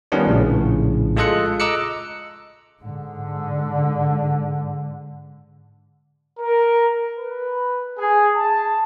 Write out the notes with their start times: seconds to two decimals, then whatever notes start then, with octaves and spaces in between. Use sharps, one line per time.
0.12 D#3 G3 B3 C#4 D4 F4
0.27 A#1 A2 C#3
1.16 G#3 F4 A4 D#5 F#6 C#7
1.60 D#5 A#5 D6 E6 F#6 C#7
2.83 G#2 D3
6.40 A#4
7.18 B4
7.98 G#4
8.36 A5